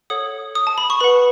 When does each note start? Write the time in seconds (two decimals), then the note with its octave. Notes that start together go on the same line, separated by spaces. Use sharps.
0.10 A4 C#5 F#5 D#6
0.55 D#6
0.67 A5
0.78 B5
0.90 C#6
1.00 B4 F#5 B5